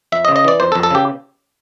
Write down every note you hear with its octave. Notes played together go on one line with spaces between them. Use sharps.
F2 E5
D#5
C#3
D#5
E3 D5
F2 C5
A4
F2
A4
C#3 G4